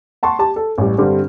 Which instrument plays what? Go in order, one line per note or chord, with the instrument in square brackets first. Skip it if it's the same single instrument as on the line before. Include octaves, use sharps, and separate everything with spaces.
[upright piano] F#5 A5 C6 C#6
G4 A5
A4
A1 G3
G2 D3 G3 C4 G4